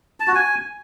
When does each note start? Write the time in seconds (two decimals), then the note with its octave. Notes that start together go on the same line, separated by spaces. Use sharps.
0.20 A5
0.28 F#4
0.35 G#5